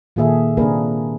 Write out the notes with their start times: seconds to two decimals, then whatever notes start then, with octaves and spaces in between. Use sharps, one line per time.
0.16 A#2 D#3 A#3 G#4 A4 E5
0.57 C3 A#3 D4 G#4 A#4 B4